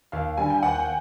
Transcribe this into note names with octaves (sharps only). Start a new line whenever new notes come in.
D#2 F5
D3 G3 G#5
G5
D#2 F#5
G5